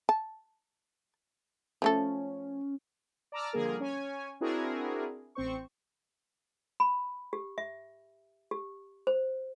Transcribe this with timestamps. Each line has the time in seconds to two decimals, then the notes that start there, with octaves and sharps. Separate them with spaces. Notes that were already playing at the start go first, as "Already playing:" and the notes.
0.09 A5
1.82 F3 A3 C#4 A4
3.32 D5 A5 A#5 D6 E6 F6
3.53 D3 F3 G3 A#3 G#4 A#4
3.80 C#4 C#5 G#5
4.40 C4 D4 E4 F#4 G#4 A#4
5.35 A1 C4 C5 C#6
6.80 B5
7.33 G4
7.58 E5
8.51 G4
9.07 C5